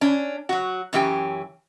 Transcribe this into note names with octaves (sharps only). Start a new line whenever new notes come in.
C#4 D4
F#3 F#4
F#2 E3 C#4 G4 G5